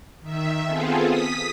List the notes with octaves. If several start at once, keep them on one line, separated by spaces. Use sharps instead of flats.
D#3 E5
B3 C4 F4 G#4 A4
D#6 B6